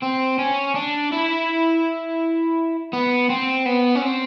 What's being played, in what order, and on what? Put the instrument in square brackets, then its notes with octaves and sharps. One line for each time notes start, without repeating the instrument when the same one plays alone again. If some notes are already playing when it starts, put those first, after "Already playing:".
[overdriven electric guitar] C4
C#4
D4
E4
B3
C4
B3
C#4
C4